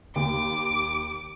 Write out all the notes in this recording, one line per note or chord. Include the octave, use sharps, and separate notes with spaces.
D#2 D6